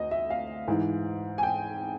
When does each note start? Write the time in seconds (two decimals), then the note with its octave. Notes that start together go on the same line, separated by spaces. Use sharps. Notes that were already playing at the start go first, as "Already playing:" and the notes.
Already playing: D2 D#5
0.11 E5
0.30 F5
0.68 G#2 E3
1.38 G#5
1.43 G5